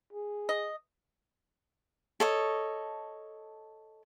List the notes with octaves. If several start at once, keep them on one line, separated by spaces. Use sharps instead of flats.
G#4
D#5
A4 C#5 D#5